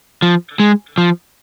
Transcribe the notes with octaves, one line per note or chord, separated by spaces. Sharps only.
F3
G#3
F3